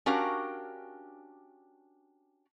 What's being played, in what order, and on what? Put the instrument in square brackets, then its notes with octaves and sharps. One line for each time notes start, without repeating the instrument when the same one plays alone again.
[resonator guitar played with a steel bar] C#4 D4 F#4 G4 A#4 F5